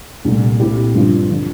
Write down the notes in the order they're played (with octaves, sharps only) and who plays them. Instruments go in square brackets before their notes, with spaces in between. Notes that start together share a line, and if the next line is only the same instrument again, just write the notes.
[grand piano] C2 A#2 A3
A#2 A3 C4 E4 G4
G2 D3 F3 C4
D3 F3